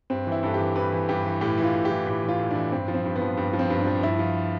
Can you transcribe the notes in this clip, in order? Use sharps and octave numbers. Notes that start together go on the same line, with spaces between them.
G2 C4
E3
E4
G2 A4
G4
E3
G2 B4
E3
G2 G4
E3
A2 G4
E3
F4
A2
G4
E3
A2 G4
E3
F4
A2
E3 D4
G2 C4
F3
C4
G2
B3
F3
G2
F3
C4
G2
D4
F3
G2 E4
F3